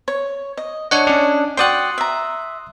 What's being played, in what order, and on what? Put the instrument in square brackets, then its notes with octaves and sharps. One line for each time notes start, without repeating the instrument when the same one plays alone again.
[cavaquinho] C#5
D#5
[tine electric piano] D4 C#5 F#5 [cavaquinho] D#5
[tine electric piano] C#4 D4
[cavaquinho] F#4 D5 G5 [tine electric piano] C6 D#6 F#6
[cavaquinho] E5 A#5